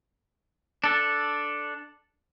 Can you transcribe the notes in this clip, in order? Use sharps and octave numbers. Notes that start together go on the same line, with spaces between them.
D4 A4